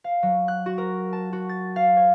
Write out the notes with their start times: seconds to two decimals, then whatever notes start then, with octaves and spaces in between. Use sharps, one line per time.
0.04 F5
0.23 F#3
0.48 F#6
0.66 F#4
0.78 A#4
1.13 A5
1.33 F#4
1.49 A6
1.76 F5
1.97 C#5